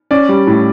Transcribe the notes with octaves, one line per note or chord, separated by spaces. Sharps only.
C#4 D5
G3
A2